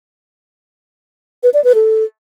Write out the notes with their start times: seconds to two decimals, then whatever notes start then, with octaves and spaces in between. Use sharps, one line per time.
1.43 B4
1.54 D5
1.64 B4
1.75 A4